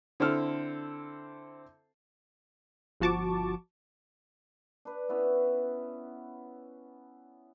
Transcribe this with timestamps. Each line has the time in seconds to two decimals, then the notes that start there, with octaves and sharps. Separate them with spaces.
0.20 D3 C4 E4 A4 F6
3.00 G1 F3 F#4 A5 C#6 D6
4.85 D4 B4
5.09 B3 C#4 E4